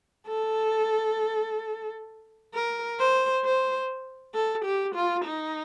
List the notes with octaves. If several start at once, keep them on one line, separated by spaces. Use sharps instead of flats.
A4
A#4
C5
C5
A4
G4
F4
D#4